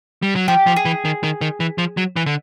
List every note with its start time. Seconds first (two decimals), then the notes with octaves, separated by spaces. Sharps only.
0.23 G3
0.36 F#3
0.48 F3 G4
0.67 F3
0.76 G#4
0.85 E3
1.05 D#3
1.23 D#3
1.41 D#3
1.60 E3
1.78 F3
1.97 F#3
2.16 E3
2.26 D3